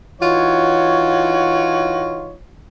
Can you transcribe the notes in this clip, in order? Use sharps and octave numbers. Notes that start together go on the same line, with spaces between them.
E3 D#4 F4 F#4 C#5